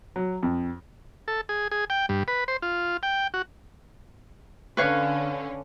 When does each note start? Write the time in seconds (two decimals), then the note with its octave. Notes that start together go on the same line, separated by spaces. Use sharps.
0.16 F#3
0.43 F2
1.28 A4
1.49 G#4
1.71 G#4
1.90 G5
2.09 G2
2.28 B4
2.48 C5
2.62 F4
3.03 G5
3.34 F#4
4.77 D3 C#4 B4 C#5 F5